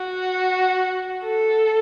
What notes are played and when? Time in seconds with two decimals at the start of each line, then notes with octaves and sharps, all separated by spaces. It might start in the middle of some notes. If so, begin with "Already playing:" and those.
Already playing: F#4
1.23 A4